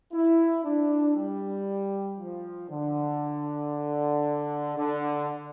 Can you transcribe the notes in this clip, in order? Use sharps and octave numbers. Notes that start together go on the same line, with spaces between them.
E4
D4
G3
F3
D3
D3